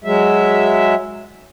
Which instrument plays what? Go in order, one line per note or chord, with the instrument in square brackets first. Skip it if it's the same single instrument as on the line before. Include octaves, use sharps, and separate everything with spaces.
[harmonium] F#3 G#3 E5